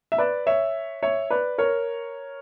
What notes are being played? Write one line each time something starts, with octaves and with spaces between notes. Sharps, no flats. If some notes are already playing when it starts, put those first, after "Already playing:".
E5
B4 D5
C#5 E5
C#5 E5
B4 D5
A#4 C#5